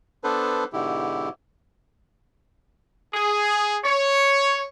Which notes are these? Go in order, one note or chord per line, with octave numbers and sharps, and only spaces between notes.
B3 D4 A4 B4 C5
G#2 B2 D3 E4 G4
G#4
C#5